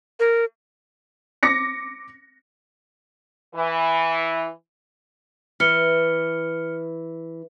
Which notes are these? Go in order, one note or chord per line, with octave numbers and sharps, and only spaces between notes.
A#4
D6 A#6 C#7
E3
E3 F6 C#7 G7